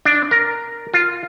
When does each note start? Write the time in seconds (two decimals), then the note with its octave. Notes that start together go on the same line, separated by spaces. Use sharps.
0.05 D4
0.31 A#4
0.94 F4